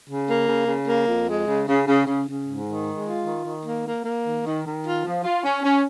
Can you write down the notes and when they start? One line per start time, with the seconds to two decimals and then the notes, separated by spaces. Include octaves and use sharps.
0.08 C#3
0.28 A#3
0.48 C#3
0.67 C#3
0.87 A#3
1.06 F2
1.27 G#3
1.47 C#3
1.67 C#3
1.87 C#3
2.06 C#3
2.26 C#3
2.46 G#2
2.66 D#3
2.86 G#3
3.06 F4
3.25 D#3
3.45 D#3
3.65 A#3
3.85 A#3
4.04 A#3
4.25 D#3
4.45 D#3
4.64 D#3
4.84 F4
5.04 F3
5.24 F4
5.44 C#4
5.63 C#4